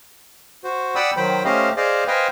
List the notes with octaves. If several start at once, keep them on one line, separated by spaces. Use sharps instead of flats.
F#4 C5
D5 F#5 G5 B5 D#6 E6
D#3 F#3 C5 G5 B5
A3 C#4 G4 C5 D#5 F5
G#4 C5 D5 D#5 F5
B4 C5 D#5 F5 G5 G#5